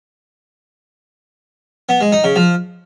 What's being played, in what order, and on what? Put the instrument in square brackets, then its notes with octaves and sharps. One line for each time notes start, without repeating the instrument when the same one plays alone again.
[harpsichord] B3
G#3
D#4
C#3
F3